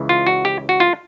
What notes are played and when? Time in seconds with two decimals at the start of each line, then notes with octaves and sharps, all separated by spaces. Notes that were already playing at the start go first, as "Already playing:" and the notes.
Already playing: C#2 C#3 E3
0.09 F4
0.27 F#4
0.45 G4
0.69 F#4
0.80 F4